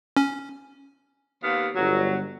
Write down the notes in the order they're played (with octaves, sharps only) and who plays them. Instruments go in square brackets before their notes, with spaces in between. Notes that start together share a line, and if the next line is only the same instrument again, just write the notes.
[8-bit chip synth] C#4
[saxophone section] D#2 B3 F5
[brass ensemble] G1 [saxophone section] F#3